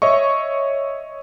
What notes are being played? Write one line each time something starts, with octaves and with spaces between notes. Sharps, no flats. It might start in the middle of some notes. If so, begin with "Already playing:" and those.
C#5 D#5 E5 C#6